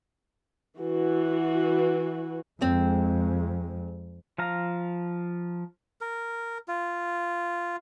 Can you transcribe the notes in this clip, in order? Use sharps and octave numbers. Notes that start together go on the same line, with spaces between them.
E3 F#4
F2 G#3 C4
F3 F5 A#5
A#4
F4